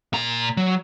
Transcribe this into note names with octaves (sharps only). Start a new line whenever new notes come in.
A#2 A#5
F#3